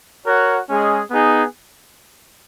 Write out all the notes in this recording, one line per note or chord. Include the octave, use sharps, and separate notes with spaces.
F#4 A#4 C#5 F#5
G#3 C#4 G#4 D#5
B3 D#4 G#4